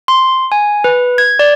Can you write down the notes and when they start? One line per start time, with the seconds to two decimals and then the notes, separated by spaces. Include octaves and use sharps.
0.08 C6
0.52 G#5
0.84 B4
1.18 G#6
1.39 D5